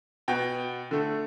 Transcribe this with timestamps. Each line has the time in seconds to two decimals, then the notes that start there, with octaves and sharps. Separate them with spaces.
0.28 B2 B3 G5
0.91 D3 A3